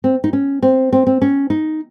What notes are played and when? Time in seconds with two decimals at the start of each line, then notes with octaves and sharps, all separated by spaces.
0.04 C4
0.24 D#4
0.33 C#4
0.63 C4
0.93 C4
1.07 C4
1.22 C#4
1.50 D#4